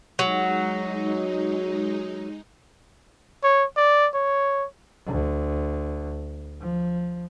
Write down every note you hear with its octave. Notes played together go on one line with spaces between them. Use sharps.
F#3 G#3 D#4
C#5
D5
C#5
D2
F3